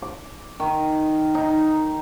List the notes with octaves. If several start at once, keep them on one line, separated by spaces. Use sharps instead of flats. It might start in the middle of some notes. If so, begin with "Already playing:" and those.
D6
D#3
D#4